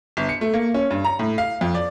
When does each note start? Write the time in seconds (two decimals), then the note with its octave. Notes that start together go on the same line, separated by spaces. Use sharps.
0.17 G1
0.29 C#7
0.41 A3
0.54 A#3
0.74 C#4
0.90 G2
1.04 A#5
1.19 A2
1.38 F5
1.61 F2
1.75 D5